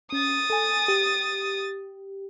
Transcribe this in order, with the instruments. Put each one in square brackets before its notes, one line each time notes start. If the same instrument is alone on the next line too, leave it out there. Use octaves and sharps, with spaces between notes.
[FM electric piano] C#4 [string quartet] D#6 A6
[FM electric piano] A4 G#5
G4